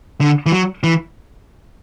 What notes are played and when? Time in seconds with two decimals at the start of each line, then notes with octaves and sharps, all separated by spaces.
0.21 D3
0.46 E3
0.52 F#3
0.84 E3